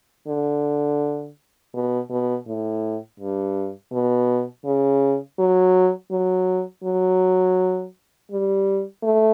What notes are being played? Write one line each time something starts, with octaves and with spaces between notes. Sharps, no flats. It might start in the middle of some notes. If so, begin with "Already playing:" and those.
D3
B2
B2
A2
G2
B2
C#3
F#3
F#3
F#3
G3
A3